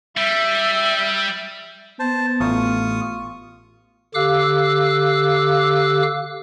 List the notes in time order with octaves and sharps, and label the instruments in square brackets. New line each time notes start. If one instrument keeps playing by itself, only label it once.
[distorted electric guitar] G3 [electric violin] E5
[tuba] B3 [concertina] C5 A5
[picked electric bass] A1 [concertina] F4 C#6 D#6
[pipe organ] D3 G4 F5 D6 E6 F#6